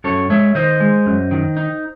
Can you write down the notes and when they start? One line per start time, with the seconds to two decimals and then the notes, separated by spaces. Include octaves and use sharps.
0.04 F#2 A4 C#5
0.30 G#3 C#5 E5
0.55 D#3 C5 D#5
0.80 G#3
1.06 F#2
1.31 D#3
1.57 D#4